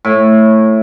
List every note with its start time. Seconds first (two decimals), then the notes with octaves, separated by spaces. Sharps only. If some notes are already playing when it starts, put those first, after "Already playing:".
0.05 A2